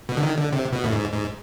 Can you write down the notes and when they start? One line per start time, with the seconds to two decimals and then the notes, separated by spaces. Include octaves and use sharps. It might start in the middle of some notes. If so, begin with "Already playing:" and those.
0.09 B2
0.17 D3
0.23 D#3
0.38 D3
0.52 C3
0.73 B2
0.84 A2
0.93 G#2
1.12 G#2